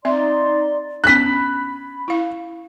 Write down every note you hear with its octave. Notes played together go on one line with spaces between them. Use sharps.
C4 D#4 D5 E5 C6
B3 C#4 D4 B5 F#6 B6
E4 F5